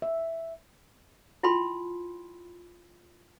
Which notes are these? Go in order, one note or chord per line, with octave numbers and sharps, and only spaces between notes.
E5
E4 F4 G5 A5 B5 C6